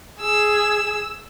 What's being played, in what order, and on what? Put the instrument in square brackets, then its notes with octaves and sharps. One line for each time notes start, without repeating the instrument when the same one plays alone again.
[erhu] G#4 [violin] E6